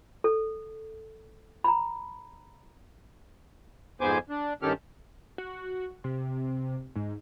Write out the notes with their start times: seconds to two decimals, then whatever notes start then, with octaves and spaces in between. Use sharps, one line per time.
0.24 A4
1.64 A#5 B5
4.01 F2 G#2 B3 C5 G#5 D6
4.29 D4
4.62 G2 D#3 C#4 G4 A4 F6
5.38 F#4
6.04 C3
6.96 G#2